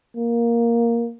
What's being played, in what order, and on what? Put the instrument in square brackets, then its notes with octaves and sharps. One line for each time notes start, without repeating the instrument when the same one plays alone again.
[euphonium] A#3